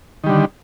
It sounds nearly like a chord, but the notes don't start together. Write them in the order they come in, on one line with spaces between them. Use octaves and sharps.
D#3 G3 D3